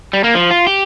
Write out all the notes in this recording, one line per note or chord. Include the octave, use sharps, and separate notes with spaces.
G3
A#3
F3
F4
G4